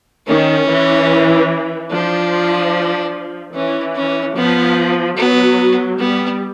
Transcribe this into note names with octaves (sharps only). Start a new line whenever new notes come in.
D#3 C#4
E3
F3 D4
E3 C#4
C#4
F3 B3
F#3 B3
G3 B3